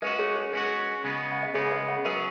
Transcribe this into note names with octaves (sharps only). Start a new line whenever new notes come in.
G#3 C#4 F#4 B4 D#5
G#4 C#5
G#4 C#5
G#3 C#4 F#4 B4
C#3 G#3 B3
F#5
D#5
C#3 G#3 B3 G#4 C#5
B4 D#5
C#5 F#5
F#3 C#4 G#4 B4 D#5